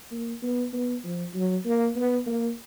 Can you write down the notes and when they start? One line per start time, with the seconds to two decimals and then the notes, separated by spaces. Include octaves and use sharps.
0.11 A#3
0.42 B3
0.73 B3
1.04 F3
1.35 F#3
1.65 A#3
1.96 B3
2.27 A#3